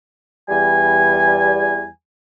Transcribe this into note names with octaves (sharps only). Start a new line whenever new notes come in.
E2 G3 G#5